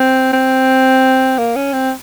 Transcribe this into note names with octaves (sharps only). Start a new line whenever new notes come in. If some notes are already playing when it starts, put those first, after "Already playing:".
Already playing: C4
C4
A#3
C#4
C4